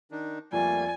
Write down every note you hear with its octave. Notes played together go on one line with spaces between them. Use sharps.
D#3 D4 D#4
F2 G3 A3 A#3 D5 G#5